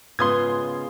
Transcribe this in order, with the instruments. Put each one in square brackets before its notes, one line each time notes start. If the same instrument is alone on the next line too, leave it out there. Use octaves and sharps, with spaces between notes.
[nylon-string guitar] G#2 C#3 F4 [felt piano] B3 [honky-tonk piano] C6 D#6 G#6